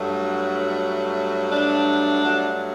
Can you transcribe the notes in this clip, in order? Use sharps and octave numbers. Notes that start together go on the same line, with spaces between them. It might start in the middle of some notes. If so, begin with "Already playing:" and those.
Already playing: G2 F#3 A3
D4
G2 F#3 A3